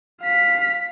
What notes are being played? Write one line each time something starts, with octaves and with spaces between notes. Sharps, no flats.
F5 B6